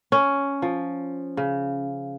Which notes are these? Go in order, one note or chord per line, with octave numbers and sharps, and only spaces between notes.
C#4
F3
C#3